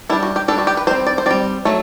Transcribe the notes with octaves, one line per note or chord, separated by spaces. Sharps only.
G3 D4 E4
F#4
G4
G3 D4 A4
F#4
G4
B4
G3 C4 C5
D5
C5
G3 C4 D5
F#3 A3